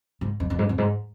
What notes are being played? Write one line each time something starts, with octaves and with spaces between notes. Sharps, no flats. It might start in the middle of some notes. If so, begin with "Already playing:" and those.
G#2
F2
F2
G#2
F2
G#2